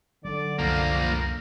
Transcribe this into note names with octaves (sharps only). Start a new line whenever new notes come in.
D3 F#3 C4 D4 D5
C2 F#2 F3 A#3 A#4